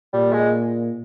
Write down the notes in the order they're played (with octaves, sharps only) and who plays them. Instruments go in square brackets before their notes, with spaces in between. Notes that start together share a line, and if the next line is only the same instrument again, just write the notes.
[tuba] A#2 [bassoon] G3
[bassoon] G#3